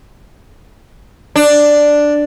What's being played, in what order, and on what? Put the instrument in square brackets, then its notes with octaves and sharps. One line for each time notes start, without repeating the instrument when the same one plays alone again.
[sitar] D4